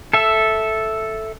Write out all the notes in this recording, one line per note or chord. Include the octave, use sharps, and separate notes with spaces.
A4 E5